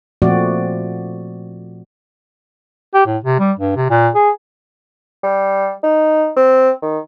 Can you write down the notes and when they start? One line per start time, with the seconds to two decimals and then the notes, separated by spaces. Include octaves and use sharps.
0.22 A#2 F3 A3 C4 F#4 D5
2.94 G4
3.06 A2
3.24 C3
3.39 G3
3.59 G2
3.76 C3
3.90 A#2
4.15 G#4
5.23 G3
5.83 D#4
6.36 C4
6.82 D#3